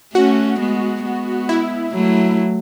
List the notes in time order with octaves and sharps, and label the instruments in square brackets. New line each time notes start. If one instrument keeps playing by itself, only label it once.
[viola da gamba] A3 C#4 [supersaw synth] F#4
[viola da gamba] G#3 B3
G#3 B3
[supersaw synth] E4
[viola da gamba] F#3 A3